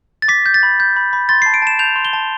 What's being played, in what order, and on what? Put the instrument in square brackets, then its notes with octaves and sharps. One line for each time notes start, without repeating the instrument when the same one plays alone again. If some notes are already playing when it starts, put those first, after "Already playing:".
[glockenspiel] A6
D6 B6
G6
A6
B5
G6
B5
B5
C6 A6
C7
A5
D7
A5 E7
G6 F7
C6
G7
A5